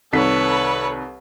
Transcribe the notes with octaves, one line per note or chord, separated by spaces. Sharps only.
C2 D#3 A4 B4 C#5 B6